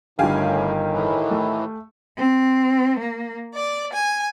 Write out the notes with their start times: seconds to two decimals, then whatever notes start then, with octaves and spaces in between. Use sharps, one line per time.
0.19 G1 A2 D3 D#3 G4 F5 G#5
0.92 A2 E3
1.31 A3
2.17 C4
2.99 A#3
3.54 D5
3.92 G#5